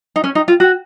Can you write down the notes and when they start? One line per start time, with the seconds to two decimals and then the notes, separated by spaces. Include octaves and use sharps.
0.16 D#4
0.24 C#4
0.35 D#4
0.48 F4
0.60 F#4